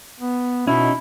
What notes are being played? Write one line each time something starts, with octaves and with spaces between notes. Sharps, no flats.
B3
B2 C#4 D#4 E4